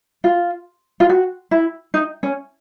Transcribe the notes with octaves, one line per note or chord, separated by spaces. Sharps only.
F4
F4
F#4
E4
D#4
C#4